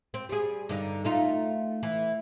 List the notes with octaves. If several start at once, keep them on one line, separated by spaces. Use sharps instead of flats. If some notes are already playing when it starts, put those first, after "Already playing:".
C4
G3 G#4
G2 D3 D#4
A3 D#4 F4
E3